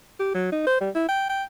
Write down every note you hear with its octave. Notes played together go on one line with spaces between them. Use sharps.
G4
F#3
D#4
C5
G3
E4
G5
G5